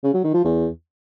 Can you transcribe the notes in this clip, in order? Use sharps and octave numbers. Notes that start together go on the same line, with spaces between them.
C#3
F#3
D#3
F3
E2